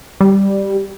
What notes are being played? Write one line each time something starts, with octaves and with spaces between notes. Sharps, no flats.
G3